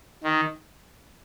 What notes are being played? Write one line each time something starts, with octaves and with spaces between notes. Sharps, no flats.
D#3